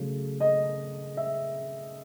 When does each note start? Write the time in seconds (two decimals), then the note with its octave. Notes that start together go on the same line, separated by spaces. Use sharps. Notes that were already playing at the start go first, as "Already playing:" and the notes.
Already playing: C#3 F#3 A3
0.40 D#5
1.17 E5